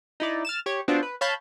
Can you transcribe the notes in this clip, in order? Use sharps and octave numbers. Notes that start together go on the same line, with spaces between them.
D#4 E4 D5
F6 A6 E7
G4 C#5
B3 C4 D4 F4 F#4
B4
C#5 F5 A5 B5 G6